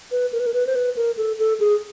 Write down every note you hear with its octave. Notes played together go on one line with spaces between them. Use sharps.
B4
A#4
B4
A#4
B4
C5
B4
A#4
A4
A4
G#4